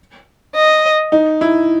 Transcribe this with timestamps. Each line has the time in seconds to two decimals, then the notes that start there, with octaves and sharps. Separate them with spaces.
0.55 D#5
1.12 D#4
1.41 E4